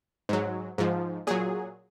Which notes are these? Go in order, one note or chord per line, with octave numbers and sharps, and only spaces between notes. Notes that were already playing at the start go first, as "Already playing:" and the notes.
G#2 F#3
G#2 F3
A#2 F#3 G#4